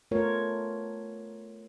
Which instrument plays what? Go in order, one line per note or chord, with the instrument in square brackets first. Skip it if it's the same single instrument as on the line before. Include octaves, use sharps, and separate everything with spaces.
[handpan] A3 B3 F4 A#4 C#5